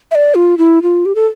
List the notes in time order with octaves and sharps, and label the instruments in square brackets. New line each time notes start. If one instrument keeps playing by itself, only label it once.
[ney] E5
D5
F4
E4
F4
G4
A4